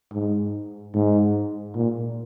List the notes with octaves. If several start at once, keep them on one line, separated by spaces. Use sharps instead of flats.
G#2
G#2
A#2